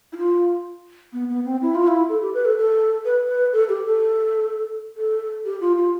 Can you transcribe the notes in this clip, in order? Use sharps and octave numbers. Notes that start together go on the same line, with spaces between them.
E4
F4
B3
B3
C4
E4
F4
E4
A4
G4
B4
A4
A4
B4
B4
A4
G4
A4
A4
G4
F4
F4